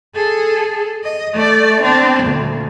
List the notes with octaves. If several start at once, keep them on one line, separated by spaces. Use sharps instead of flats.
G#4 A4
D#5
A3 D5
C4 D4
D2 A#2